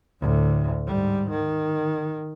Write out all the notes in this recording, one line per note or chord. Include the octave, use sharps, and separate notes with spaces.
D2 A2
G#2 G3
D#3